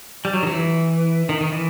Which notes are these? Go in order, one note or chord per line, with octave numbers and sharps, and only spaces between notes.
G3
F#3
D#3
F#3
E3
D#3
D#3
E3